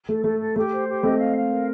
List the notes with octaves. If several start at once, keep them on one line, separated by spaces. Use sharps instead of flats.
A3 A4
A3 A4
A4
A3 G4
C5
G4
A3 C4 D#5
F5
F5
A#4